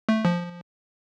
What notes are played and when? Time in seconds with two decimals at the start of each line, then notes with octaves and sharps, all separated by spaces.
0.09 A3
0.25 F3